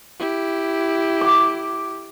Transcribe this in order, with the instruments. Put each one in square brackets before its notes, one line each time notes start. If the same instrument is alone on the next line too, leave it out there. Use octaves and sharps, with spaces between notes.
[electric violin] E4 G4
[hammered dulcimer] D6